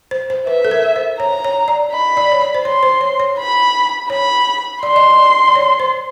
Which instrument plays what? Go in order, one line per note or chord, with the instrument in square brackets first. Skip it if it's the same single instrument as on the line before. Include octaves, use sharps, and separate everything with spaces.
[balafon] C5
C5
[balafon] B4 [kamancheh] E5
[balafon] A4
A#4
C5
[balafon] C#5 [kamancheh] A#5
[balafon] C#5
D5
[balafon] D#5 [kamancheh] B5
[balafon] D5
C#5
D5
C5
[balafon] C#5 [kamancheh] C6
[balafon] C5
C#5
C#5
[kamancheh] B5
[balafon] C#5 [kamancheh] B5
[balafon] D5 [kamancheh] C6
[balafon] D#5
D5
D5
C#5
C5